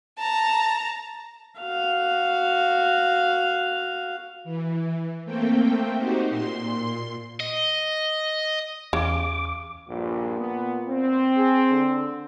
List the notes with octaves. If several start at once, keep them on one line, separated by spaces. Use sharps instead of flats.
A5 A#5
F#4 F5
E3
A3 A#3 C4 G5
D#4 F#4 G4 C5
A#2 C6
D#5
E2 C#3 D6
A#1 G2 A#2
B3
C4
G#4
D3